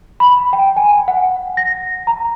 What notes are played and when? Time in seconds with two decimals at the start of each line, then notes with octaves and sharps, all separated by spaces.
0.20 B5
0.53 G5
0.77 G#5
1.08 F#5
1.57 A#6
2.07 A#5